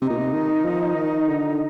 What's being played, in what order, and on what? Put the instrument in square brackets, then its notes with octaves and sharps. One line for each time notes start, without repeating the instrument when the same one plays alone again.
[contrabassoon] C3 [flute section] D#4
[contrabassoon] A#2
C3
D#3
F3
D#3
D3